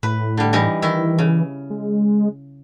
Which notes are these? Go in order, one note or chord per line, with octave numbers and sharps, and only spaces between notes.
A2 B4
D3 G3
E3 G3 D#4
D#3 E3 E4
C#3
G#3